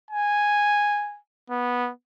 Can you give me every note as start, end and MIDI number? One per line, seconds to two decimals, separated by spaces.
0.10 1.18 80
1.50 1.91 59